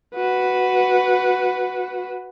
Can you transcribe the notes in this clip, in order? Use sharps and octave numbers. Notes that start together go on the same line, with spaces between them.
F#4 B4